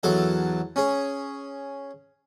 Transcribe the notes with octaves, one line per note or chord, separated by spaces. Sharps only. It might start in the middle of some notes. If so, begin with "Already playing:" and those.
E2 F#3 A4 E5
C#4 G#4